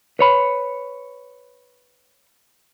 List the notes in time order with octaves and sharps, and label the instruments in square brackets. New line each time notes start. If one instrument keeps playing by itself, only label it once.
[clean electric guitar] B4 C#5 B5